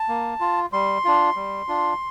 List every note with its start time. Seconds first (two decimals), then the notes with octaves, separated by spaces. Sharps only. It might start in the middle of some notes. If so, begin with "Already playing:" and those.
Already playing: A5
0.09 A#3
0.41 F4
0.73 G3 C6
1.05 D4 F4
1.36 G3
1.68 D4 F4